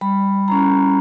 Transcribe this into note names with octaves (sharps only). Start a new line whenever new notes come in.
G3 B5
C#4 E4 A#5